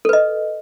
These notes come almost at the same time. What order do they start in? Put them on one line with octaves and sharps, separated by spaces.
A4 B4 D#5